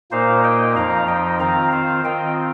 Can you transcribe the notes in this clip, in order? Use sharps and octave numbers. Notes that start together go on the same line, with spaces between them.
A#2 A#3 D#4 C5 F5
D#5 G5
F2 F3 D#4 F5 A#5
D#5 G5
D#3 C4 F4 F5 A#5
C5 F5
D#3 C4 F4 D#5 G5